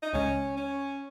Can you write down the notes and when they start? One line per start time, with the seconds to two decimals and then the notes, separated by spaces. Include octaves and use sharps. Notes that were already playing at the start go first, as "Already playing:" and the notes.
0.02 D#4
0.13 C#2 C#3 G#3 C#4
0.57 C#4